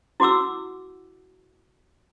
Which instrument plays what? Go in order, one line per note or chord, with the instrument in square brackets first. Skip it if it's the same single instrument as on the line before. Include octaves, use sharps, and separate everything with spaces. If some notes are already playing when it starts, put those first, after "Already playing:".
[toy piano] E4 F#4 F#5 D6 E6